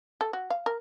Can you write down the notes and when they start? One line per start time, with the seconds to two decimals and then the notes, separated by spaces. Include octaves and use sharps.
0.21 A4
0.33 F#4
0.50 F5
0.66 A#4